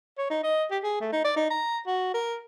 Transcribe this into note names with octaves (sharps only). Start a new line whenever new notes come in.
C#5
D#4
D#5
G4
G#4
A3
D#4
D5
D#4
A#5
F#4
A#4